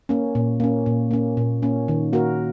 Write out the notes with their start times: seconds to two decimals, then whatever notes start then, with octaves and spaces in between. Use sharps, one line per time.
0.09 A#3 C#4
0.35 A#2
0.60 A#3 C#4
0.86 A#2
1.11 A#3 C#4
1.37 A#2
1.62 A#3 C#4
1.88 D#3
2.13 A#3 F#4 A#4